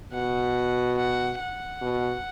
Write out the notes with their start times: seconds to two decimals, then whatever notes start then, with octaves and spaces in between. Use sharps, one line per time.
0.13 B2 F#5
0.98 F#5
1.41 F#5
1.82 B2